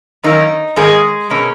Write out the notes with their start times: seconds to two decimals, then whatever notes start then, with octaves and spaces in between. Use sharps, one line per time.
0.23 F#2 D#3 A#3 C#4 D#4
0.76 G#2 D#3 G#3 A#3 C#4 G#4
1.30 B2 A#3 C#4